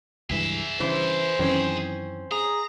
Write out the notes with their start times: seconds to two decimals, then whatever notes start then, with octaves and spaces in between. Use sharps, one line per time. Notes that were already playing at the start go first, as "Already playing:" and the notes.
0.30 C#2 G2 E3 G#4 E5
0.80 G2 C#3 E3 C5
1.39 F#2 D#3 E3 C4 C#4
2.32 G#4 A#5